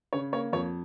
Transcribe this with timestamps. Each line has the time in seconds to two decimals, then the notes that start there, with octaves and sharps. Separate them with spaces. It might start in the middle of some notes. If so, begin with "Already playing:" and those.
0.13 C#3 C#5
0.33 A#3 C#5
0.53 F2 C#5